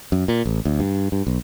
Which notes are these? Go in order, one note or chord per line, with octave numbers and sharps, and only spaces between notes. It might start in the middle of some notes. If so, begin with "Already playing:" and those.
F#2
A#2
A1
D2
G2
G2
B1